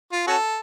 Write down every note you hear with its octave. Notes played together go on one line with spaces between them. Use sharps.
F4
C#4 F#4 A4